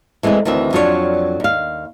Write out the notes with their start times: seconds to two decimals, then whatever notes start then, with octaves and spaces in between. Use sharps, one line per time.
0.23 E3 G#3 A3 C4 E4
0.45 D2 D#3 E3 C4 E5
0.73 F2 F#3 D4 F4 G4 C#5
1.40 D#2 F5